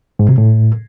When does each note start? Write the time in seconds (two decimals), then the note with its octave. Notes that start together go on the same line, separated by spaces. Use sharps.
0.19 G#2
0.29 C3
0.38 A2